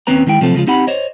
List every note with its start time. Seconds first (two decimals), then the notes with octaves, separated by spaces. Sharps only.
0.07 D#2 C4 C#4 B4 A#5
0.27 D#3 G#3 E4 G5
0.41 C3 F3 F#3 A3 C4 A4
0.55 C#3 F3 G#3 F4
0.67 C4 D#4 G4 F#5 B5
0.87 C5 C#5 D#5